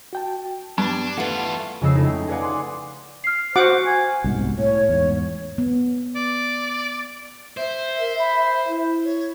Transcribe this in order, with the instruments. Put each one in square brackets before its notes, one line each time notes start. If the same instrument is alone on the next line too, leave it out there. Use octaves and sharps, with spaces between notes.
[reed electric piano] F#4 G5 A5
[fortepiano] G2 [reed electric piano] B3 [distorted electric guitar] D4
[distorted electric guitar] E2 F4 [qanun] A3 B4 [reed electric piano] F#5
[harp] F2 C#3 G#3 D#5 E6 C7
G#3 A3 C#4 D#4 E4
G5
G#4 B4 D5 F5 F#5 G#5
F#5 G#5 C6 D6
[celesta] F6 C7
[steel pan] F#4 F#5 D6 [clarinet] C5
[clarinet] G#5
[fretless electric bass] C2 G#2 B2
[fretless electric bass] A2 [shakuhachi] C#5
[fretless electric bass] E2 G#2
[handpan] B3
[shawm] D5
[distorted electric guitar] C5 [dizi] E5
[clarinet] A#4
B5
E4
[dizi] C#5